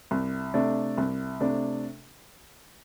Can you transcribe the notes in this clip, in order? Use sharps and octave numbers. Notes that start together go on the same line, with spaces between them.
C2
C3 A3 D4
C2
C3 A3 D4